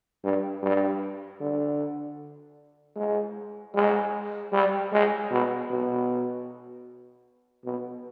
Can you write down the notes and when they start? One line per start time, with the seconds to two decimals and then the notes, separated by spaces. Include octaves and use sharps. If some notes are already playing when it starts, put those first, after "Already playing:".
0.24 G2
0.62 G2
1.40 D3
2.96 G#3
3.75 G#3
4.52 G3
4.92 G#3
5.31 B2
5.70 B2
7.65 B2